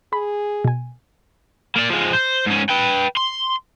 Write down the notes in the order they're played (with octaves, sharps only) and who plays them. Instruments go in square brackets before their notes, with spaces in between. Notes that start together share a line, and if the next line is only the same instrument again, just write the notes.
[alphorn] G#4 [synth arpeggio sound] B5
[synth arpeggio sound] B2 G#5
[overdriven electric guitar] A#3 D5
F3 G#3
C5
G#2 C#4
B4 G5
C6